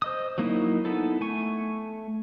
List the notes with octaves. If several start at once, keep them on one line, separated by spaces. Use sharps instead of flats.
C5 D#5 D#6
F#3 A#3 D#4 E4
B3 D#4 E4 A4
A3 G#5 C#6